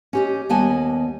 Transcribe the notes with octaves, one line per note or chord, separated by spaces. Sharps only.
C#4 G4 D#5
D#2 G3 B3 D#5 G#5 A5